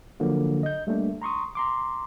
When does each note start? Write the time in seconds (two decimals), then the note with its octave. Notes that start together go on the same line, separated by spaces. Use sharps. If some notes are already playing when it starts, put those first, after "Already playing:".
0.20 D3 F3 F#3 A#3
0.63 D#5 G6
0.87 G3 A3 A#3 D4
1.22 A#5 C6 C#6 D#6
1.55 A#5 C6 D6